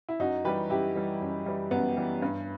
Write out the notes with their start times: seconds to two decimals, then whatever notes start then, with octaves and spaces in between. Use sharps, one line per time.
0.09 E4
0.19 F#2 D#4 F#4
0.44 E3 G3 G4 B4
0.70 F#2 E4 G4
0.96 E3 G3
1.21 F#2
1.46 E3 G3
1.71 F#2 B3
1.97 E3 G3
2.22 G2